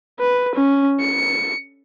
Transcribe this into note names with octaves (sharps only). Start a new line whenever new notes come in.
B4
C#4
C#7